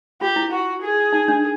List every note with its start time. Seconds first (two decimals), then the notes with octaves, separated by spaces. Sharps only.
0.21 F4 G4
0.36 E4
0.52 F#4
0.82 G#4
1.13 D#4
1.28 D4